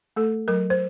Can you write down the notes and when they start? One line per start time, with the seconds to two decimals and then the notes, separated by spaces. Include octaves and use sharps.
0.16 A3 A4
0.48 F#3 A#4
0.70 C5